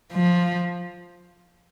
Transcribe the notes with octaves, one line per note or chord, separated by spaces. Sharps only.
F3